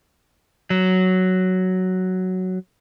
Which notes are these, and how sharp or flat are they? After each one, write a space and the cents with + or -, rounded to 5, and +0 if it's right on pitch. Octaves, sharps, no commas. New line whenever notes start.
F#3 +5